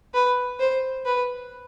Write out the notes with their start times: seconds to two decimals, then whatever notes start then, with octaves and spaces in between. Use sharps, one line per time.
0.14 B4
0.60 C5
1.05 B4